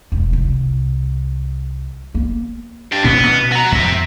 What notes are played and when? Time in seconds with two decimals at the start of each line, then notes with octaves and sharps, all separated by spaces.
0.12 E1
0.33 C2
2.14 A#3 B3
2.92 D4 G4
3.04 A1 A#2 B3 C#4
3.28 B2
3.52 F#4 A#5
3.72 F2 C4 E5